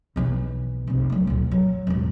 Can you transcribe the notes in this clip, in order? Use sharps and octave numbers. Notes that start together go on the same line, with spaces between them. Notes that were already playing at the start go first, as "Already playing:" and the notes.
B1 E3
F1 C2
F#3 A3
D2 A#2
F#3
E1 A1